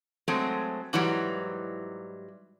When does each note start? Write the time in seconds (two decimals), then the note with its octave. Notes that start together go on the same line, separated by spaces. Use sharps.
0.28 F#3 G#3 A3 C4
0.93 G#2 E3 F#3 G3